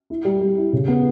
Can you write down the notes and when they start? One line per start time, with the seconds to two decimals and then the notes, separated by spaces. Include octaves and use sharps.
0.10 E4
0.25 G3
0.41 G3
0.57 E4
0.73 C#3
0.88 B3